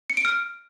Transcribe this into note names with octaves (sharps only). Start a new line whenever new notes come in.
C#7
D7
F6